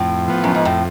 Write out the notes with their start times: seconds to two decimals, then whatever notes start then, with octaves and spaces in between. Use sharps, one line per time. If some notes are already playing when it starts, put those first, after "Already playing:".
Already playing: F2 A2
0.28 F3 B3
0.44 F#2
0.55 G#2
0.65 F2 A2